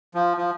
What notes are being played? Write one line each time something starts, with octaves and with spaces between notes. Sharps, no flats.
F3
F3